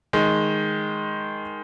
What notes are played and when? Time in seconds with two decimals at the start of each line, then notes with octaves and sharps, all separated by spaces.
0.13 D#3 G#3